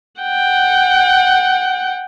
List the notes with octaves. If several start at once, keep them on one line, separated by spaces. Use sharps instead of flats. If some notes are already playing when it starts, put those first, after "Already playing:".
F#5 G5